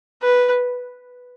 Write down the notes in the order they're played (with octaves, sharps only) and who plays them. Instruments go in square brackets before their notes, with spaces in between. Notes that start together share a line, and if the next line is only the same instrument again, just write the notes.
[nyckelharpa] B4